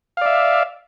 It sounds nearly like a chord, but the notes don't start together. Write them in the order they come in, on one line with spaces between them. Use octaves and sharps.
F5 D5 E5